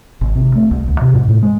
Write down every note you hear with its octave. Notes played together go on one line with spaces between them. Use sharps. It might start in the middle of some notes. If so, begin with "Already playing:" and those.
G#1
C3
A3
C2
D2
C3
G#2
A2
G#3